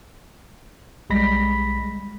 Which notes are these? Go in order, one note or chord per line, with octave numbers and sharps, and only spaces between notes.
B1 G3 G#3 B5 A#6 B6